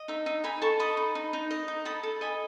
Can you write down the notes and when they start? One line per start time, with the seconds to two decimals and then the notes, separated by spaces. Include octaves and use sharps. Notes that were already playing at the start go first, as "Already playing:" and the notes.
Already playing: D#5
0.08 D#4 E5
0.26 D#4 E5
0.44 D#4 G#5 B5
0.62 A4 A5 C#6
0.80 D#5 B5 D#6
0.97 D#4
1.15 D#4
1.33 D#4
1.51 D#5
1.68 D#4
1.85 A4 B5 D#6
2.03 A4
2.21 D#5 G#5 B5